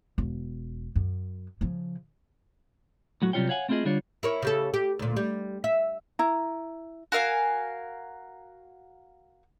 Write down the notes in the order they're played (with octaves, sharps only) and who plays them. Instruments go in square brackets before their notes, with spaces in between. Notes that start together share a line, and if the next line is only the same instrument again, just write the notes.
[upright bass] E1
F#2
C#3 F3
[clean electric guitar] A2 F#3 F#4
C3 F#3 G3 F4 C#5 G5
C#5 F5 F#5 G#5
A3 C4 E4 F4 G#4 D#5
D3 G3 D4 F4 C#5
[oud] E4 A#4 C#5
C#3 G4 A4
G4
D2 A#2
G3
E5
[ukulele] E4 A#5
[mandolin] F#4 A#4 F5 G#5